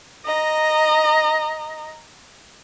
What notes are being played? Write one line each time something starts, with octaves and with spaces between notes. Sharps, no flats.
D#5 A#5